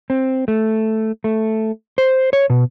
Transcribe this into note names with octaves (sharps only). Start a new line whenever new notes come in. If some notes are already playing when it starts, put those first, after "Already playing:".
C4
A3
A3
C5
C#5
B2